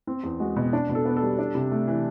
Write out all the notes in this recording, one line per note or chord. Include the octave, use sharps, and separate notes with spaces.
C4
E2
G#3 F#4
B2
D4
B2
A4
B3
A4
G3
D4
C3
A3
E3